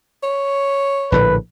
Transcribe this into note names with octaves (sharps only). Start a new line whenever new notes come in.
C#5
A#1 A2 D3 B4